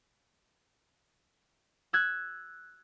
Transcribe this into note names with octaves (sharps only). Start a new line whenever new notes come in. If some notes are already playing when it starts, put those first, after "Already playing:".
E6 F#6 G#6